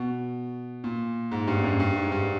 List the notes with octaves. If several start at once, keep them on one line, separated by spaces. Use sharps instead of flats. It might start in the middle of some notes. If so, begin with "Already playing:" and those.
Already playing: B2
A#2
G#2
G2
F#2
G2
G#2
G2